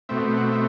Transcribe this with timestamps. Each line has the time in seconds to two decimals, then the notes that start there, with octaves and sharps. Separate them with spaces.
0.09 B2 A3 C4 E5
0.37 F#5
0.52 E5